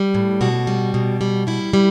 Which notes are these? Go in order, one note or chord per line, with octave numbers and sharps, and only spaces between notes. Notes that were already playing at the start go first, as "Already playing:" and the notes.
Already playing: G3
A2
B2 F#4
G3
B2
G3
G3 E4
G3